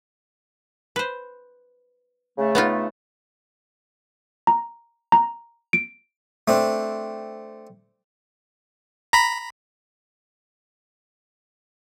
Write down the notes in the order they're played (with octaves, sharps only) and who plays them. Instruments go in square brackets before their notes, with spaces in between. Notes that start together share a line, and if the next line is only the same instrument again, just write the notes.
[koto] B4 C5
[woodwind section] C#3 A3
[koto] B3 D#4 F4
[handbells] A#5
A#5
D7
[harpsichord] A3 C4 D4
[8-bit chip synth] A#5 B5